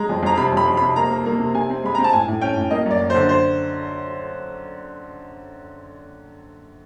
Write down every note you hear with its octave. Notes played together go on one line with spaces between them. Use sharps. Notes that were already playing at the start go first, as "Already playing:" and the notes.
Already playing: G#3 A#5
F2
F2 A#5
C3 B5
F2 B5
F2
B5
C3
A#3 A#5
A#3
A#3
C3
C3 G#5
C4
G#3 B5
C4 A#5
A5
A2 G#5
A2
C#4 G5
A2
A#3 D#5
F#2
D5
F#2
C5
D3
C5